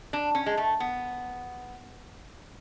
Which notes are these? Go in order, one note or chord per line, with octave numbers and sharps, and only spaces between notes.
D4
C#4
G#3
A3
B3